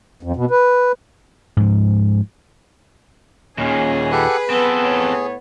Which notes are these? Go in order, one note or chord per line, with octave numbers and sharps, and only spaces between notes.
F2
B2
B4
G#2 F3
D#2 A#2 C#4 G#4
G4 A4 B4 F#5
B3 C4 G#4 A4
A2 C#5